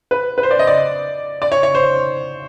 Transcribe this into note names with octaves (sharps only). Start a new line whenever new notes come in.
B4
B4
C5
D5
D#5
D5
D5
C#5
C#5
C5